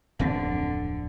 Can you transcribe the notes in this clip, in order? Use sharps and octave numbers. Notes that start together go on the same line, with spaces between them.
D1 F2 D3 C4